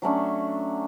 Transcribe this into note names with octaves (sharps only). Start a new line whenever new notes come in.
F#3 A3 C#4 D4